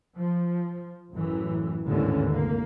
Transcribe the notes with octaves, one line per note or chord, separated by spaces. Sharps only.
F3
A1 F#2 A2 E3
A1 D#2 G#2 D3 E3 C#4
F1 A#3